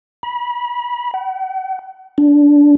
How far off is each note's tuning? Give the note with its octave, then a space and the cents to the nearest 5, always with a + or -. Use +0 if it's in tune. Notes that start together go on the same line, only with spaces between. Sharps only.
B5 -30
F#5 +45
D4 -15